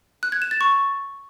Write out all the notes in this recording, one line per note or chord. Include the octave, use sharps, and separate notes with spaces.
F#6
G#6
E7
A6
C#6